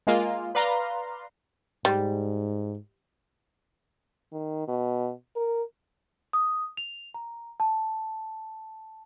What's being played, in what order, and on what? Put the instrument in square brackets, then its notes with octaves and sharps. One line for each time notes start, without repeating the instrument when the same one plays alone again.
[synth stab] G#3 A#3 F4
B4 D5 F5 A#5 C6
[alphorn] G#2 [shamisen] G3
[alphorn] D#3
B2
A#4
[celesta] D#6
F7
A#5
A5